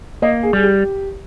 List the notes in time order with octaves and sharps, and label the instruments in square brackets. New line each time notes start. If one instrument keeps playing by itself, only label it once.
[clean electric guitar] A#3 [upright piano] D#5
[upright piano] G#4
[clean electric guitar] G3 [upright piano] G#4
[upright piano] G4